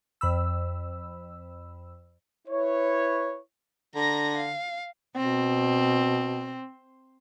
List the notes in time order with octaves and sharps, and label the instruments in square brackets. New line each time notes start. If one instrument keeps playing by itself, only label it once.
[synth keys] F2 B5 E6
[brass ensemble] E4 B4 C#5
[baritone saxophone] D3 [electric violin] A#5 A#6
[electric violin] F5
[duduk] B2 [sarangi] C4